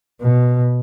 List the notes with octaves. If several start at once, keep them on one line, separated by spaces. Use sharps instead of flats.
B2